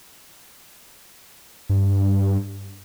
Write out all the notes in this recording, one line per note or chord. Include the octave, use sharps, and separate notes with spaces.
G2